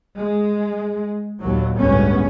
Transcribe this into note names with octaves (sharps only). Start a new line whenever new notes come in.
G#3
D#2 A#2 F#3
G1 C#2 A2 B3 C#4